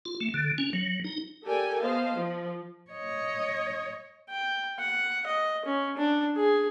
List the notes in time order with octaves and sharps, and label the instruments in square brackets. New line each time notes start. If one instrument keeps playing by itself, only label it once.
[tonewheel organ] F4
A3
D3
C#4
F#3
D#4
[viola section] G4 A4 A#4 D5 G5 G#5
B3 C5 D#5 F5 A5
F3
[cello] C#5 D#5
[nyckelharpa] G5
F#5
D#5
C#4
D4
G#4